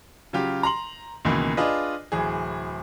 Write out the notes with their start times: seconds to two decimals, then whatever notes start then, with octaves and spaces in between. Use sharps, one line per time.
0.33 C#3 F#3 F4 G4
0.63 A#5 C6 F#7
1.25 C#2 B2 D#3 E3 A#3
1.57 D4 F4 G#4 B4 D#5
2.12 D1 E3 G#4